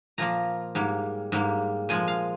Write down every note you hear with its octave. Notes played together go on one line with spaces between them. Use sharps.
A#2 F3 A#3 A#5
G#2 G3 A#3
G#2 G3 A#3
A#2 F3 G#3 G#5
F5